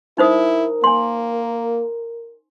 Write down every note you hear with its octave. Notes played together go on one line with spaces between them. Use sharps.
D#4 E4 A#4 C5 D#6
A#3 G#5 C6